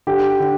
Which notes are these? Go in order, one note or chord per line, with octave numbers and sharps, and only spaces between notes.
D3 G4
D3